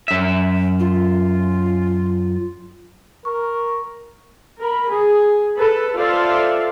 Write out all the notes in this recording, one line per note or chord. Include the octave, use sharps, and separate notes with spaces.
F#2 E5
F4
A#4 C#6
A#4 B5
G#4
A4 B4
F4 A4 C5 D5 E5 F5